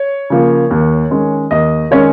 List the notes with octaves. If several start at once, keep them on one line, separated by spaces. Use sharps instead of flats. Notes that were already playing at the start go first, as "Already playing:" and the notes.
Already playing: C#5
C#3 F3 A#3
D#2
D#3 G#3 C#4
D#2 D#5
D#3 G#3 C#4 C#5